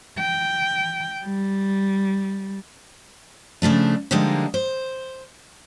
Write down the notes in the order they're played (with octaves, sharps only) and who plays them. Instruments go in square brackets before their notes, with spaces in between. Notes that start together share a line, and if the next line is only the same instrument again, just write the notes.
[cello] G5
G3
[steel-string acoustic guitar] C#3 F3 A3 D4
D3 F3 G3 G#3 A#3 D#4
C5